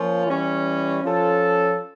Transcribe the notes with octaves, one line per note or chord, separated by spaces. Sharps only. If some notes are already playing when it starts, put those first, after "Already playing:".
Already playing: F3 A#3 C#4 F4
E3 G3 C#4
F3 C#4 F4 A4